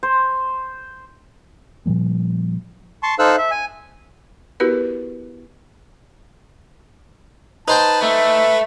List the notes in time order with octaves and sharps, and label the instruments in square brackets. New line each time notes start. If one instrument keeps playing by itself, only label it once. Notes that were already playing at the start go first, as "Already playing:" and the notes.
[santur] C5
[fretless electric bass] A#2 F3 G3 A#3
[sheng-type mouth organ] A5 C6 C#6
D#4 A4 C5 F5 E6 F#6
E5
G#5
[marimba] B3 E4 F#4 G4 A#4 B4
[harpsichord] D#4 C5 G5 [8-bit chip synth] B4 [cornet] A5
[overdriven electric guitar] A3 [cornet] E5